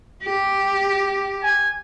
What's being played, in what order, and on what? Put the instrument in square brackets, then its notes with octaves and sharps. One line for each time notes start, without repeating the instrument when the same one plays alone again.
[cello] G4
[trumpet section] G#5